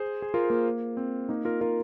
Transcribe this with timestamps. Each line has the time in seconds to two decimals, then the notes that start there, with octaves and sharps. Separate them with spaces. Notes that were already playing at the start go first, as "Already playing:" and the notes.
Already playing: G#4 C5
0.22 G#4
0.34 F4 A#4
0.50 A#3
0.97 C4
1.29 A#3 D#4
1.45 F4 A#4
1.61 F4 A#4